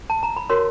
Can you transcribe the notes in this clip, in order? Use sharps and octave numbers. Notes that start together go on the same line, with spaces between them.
A5
A#5
B5
F#4 A#4 C#5 C6